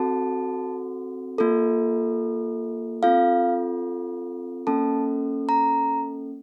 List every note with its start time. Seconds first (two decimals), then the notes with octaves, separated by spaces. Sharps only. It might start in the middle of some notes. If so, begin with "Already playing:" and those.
Already playing: C4 F#4 A4 A5
1.38 A#3 F4 A4
3.03 C4 F4 A4 F5
4.67 A#3 C#4 A4 A5
5.49 A#5